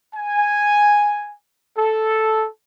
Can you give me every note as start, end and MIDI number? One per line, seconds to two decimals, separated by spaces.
0.16 1.34 80
1.77 2.49 69